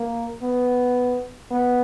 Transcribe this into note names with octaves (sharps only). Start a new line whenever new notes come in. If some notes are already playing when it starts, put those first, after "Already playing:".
Already playing: A#3
B3
B3